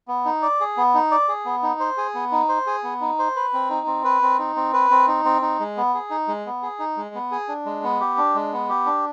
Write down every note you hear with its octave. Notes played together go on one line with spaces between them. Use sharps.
B3
D#4
D5
G#4
B3
D#4
D5
G#4
B3
D#4
C5
G#4
B3
D#4
C5
G#4
B3
D#4
C5
B4
C4
D#4
C4
B4
C4
D#4
C4
B4
C4
D#4
C4
D#4
G#3
B3
G#4
D#4
G#3
B3
G#4
D#4
G#3
B3
G#4
D4
G#3
B3
G4
D4
G#3
B3
G4
D4